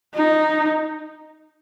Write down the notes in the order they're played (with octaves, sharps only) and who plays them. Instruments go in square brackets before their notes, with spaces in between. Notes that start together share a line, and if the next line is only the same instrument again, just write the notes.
[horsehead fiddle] D#4